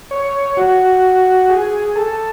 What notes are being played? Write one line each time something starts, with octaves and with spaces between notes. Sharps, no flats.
C#5
F#4
G#4
A4